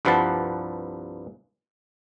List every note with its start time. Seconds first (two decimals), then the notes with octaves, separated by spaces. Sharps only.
0.05 C2 G2 F3 B4 F#5 A5